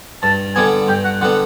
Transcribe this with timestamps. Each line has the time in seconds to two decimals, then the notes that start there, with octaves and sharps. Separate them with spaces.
0.22 G2 A5
0.55 D3 G3 B3 G#5
0.88 G2 G5
1.04 F#5
1.21 D3 G3 B3 F#5